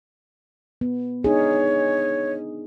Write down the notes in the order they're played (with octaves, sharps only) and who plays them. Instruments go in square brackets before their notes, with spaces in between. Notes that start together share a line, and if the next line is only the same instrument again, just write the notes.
[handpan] B3
[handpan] D4 D#4 G#4 [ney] C#5